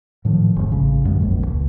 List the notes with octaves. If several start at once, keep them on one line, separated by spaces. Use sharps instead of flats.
A2 D#3 F3
F1 G#2
A1 C#3
F#2 D3 G#3
F1 A#1 F2
C#2